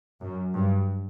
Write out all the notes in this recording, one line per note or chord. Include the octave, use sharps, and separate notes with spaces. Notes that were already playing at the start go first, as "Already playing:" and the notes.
F#2
G2